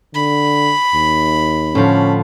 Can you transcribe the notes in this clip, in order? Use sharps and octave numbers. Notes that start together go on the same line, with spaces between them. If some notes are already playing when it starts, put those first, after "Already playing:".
D3 B5
D#2
A2 D3 F3 C#4